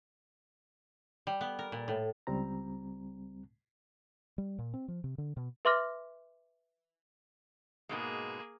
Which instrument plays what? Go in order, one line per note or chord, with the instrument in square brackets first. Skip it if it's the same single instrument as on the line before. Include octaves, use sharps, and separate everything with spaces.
[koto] G3
B3
A#4
A#2
A2
[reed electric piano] C#2 G3 C4 A#5
[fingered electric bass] G3
A#2
C4
F3
C3
D3
B2
[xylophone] B4 E5 C6 D6 F6 A#6
[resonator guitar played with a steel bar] G#2 B2 G#3 [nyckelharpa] A#3 G#4